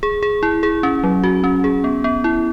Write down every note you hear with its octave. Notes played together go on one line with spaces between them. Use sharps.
G#4
G#4
E4
G#4
C#4
F#3
F#4
C#4
G#4
B3
B3
E4